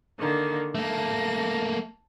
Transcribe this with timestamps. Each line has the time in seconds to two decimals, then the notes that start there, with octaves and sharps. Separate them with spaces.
0.18 D3 D#3 A#3
0.75 A3 A#3 A5 A#6